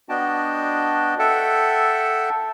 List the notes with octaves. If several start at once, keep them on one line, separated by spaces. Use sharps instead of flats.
B3 D4 F#4 D#5 G5 A5
A4 E5 F#5 G5 A5